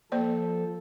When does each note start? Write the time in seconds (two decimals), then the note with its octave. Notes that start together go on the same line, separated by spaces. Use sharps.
0.12 F3 A#3 A4 C5 D5